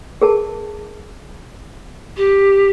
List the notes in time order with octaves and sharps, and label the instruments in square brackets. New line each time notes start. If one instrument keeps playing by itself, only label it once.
[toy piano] G#4 A#4 A5
[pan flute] G4